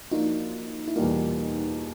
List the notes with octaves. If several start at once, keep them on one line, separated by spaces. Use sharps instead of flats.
F3 A#3 D4 D#4 F4 F#4
E4
E2 B2 G3 A#3 D#4 F4